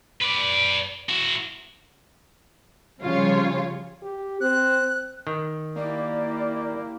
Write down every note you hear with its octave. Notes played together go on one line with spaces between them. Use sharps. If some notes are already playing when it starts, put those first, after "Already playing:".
B4 D5
E4 F#4
C#3 F3 G3 F4 C#5
G4
C4 F#6
D#3
A#3 E4 G4 D5